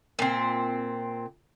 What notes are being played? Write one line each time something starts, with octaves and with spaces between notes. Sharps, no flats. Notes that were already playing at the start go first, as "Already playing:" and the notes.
A#2 C4